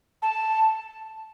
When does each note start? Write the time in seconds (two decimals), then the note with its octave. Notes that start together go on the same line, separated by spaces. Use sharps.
0.22 A5